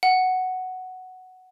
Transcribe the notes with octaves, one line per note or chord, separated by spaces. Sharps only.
F#5